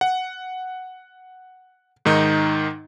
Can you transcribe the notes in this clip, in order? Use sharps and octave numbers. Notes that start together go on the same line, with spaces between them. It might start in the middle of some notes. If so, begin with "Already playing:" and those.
F#5
G#2 D#3 D#4